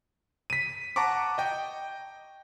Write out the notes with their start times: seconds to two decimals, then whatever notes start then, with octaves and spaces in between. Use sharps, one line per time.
0.50 B6 D#7
0.96 F#5 A5 A#5 C#6 D6
1.38 D#5 G5